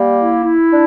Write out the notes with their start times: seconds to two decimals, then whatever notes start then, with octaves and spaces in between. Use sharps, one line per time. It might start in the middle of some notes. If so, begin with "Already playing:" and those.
Already playing: G3 A#3
0.20 E4
0.44 E4
0.71 D4